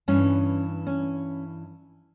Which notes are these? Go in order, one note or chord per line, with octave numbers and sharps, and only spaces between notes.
G2 E3 C#4
C#4